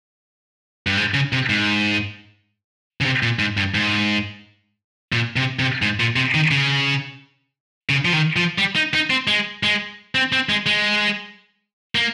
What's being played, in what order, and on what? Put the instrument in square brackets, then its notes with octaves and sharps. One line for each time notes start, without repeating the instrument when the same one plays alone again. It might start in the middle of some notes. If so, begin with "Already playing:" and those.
[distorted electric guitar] G2
G#2
C#3
C3
G#2
C#3
C3
A#2
G#2
G2
G#2
A#2
C3
C3
G#2
A#2
C3
D#3
C#3
C#3
F3
D#3
F3
G3
D#4
D#4
C4
G#3
G#3
C4
C4
G#3
G#3
A#3